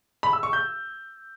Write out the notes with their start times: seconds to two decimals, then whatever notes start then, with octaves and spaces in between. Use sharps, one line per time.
0.23 B5
0.33 E6
0.43 C#6
0.53 G6